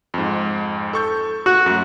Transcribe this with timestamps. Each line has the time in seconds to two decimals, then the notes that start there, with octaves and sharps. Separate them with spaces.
0.14 F2 G#2
0.93 A4 C#6 G6
1.46 F#4 C#6
1.66 F#2 A3